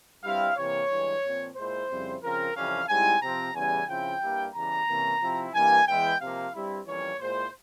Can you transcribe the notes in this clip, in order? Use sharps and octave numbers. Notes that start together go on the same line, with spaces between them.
G2 G3 C4 E4 F5
C3 E3 A#3 C#5
G2 E3 G#3
A#2 F3 C4
A#2 G#3 E4 C5
F2 C#3 G3 C4 E4
C#3 F3 C4 A#4
F2 C3 E3 G3 C#4 F5
G#2 G3 C4 E4 G#5
C3 F3 C4 A#5
E2 C#3 E3 G3 G#5
C#3 F3 C4 E4 G5
G2 G3 A#3 E4
E2 C#3 E3 G3 A#5
C3 E3 A#3 C#4 E4
C3 F3 C4 E4
G2 E3 G3 A#3 G#5
E2 E3 G#3 E4 G5
C3 F3 A#3 F5
G2 G3 C4 E4
F2 E3 G3 A#3 C#4 C#5
A#2 G#3 E4 C5